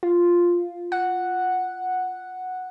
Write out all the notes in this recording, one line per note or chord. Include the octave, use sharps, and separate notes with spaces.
F4
F#5